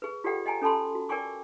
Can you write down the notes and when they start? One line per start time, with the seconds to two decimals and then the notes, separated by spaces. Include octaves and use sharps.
0.02 G#4 B4
0.24 F4 G4 A4 D5 F#5 G5
0.46 D#5 G5 G#5 A#5
0.62 C#4 A4 A5 B5 C6
0.95 F#4
1.09 A#4 D5 G5 G#5 C#6 D6